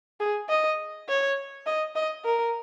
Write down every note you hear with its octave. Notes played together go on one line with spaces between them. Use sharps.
G#4
D#5
C#5
D#5
D#5
A#4